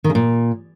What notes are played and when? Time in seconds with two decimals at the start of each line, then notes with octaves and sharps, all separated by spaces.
0.04 D#3
0.10 C#3
0.15 A#2